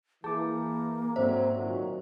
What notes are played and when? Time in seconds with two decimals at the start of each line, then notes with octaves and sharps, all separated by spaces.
0.24 E3 A#3 G#4 A5 D6
1.16 G#2 D3 F#3 C4 C5 E5
1.56 A#2 D#3 F#3